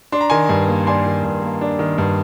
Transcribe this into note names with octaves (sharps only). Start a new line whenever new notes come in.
D4 C6
A#5
D#3 G#5 C6
G2
A#3
D4 G#5 C6
D#3
G2
A#3
D4
D#3
G2